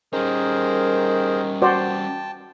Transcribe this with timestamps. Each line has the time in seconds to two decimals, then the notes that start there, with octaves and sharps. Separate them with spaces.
0.13 D#3 G3 C#4 G#4 A#4 C5
1.62 F#4 C5 D5 G5 A5